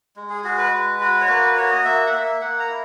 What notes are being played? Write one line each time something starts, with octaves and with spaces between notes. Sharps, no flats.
G#3
G#4
F#4 G#4
B4
G#3
F#4
C#5
A#3 B4
B4
F#4 C#5
D#5
A#3 E5
F#5
A#3 E5
A#3 F#5
A#5
E4